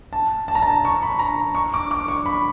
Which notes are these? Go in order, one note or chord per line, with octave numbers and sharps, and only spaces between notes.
A5
A5
A#5
A5
C#6
B5
A#5
C#6
D6
D6
C#6
B5